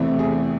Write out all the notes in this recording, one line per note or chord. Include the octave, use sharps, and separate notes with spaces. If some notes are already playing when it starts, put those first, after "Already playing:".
Already playing: E2 C3 E3 A3 C4
G#4